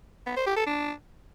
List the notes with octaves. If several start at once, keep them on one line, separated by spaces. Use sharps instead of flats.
B3
C5
G4
A4
D4